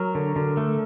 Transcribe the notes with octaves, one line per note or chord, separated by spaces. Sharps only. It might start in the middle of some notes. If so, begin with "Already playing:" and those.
Already playing: F#3 A#4
D3
D3
A3